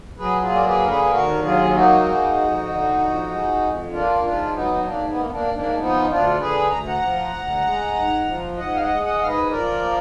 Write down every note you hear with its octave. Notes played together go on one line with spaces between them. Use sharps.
F#3 G#4 B4
F4 G#4
A#3
D5
G#4 B4
D3 A#4
G#4 B4
B4
D#2 F#4 A#4
F#3 F4 G#4
F4
A#3 D#4 F#4
G#3
F2
D3
F2
G#3
F2
A#3 D4 F4
G#2 D4 F4
F#3 B3 D#4
D#4
G#2 A#3 D4
B3
A#3
B3
A#3 D4
G#2
A#3 D4
F3 B3 D#4
D2 D4 F4
D3 G#4 B4
D2 A#5
F#5 A#5
F3
D2
G#3
G#2
F3
G#2 D#5 F#5
F5
D#5 F#5
G#3
D#5 F#5
G#2 F5
B4 D#5
F3 A#4 D5
A#3